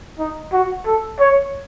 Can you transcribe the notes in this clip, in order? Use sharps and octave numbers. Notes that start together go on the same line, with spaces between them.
D#4
F#4
A4
C#5